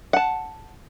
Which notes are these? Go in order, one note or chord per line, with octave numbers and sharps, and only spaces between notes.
F#5 A5